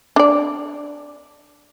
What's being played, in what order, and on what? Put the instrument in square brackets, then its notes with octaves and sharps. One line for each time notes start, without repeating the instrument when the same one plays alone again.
[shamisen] D4 D5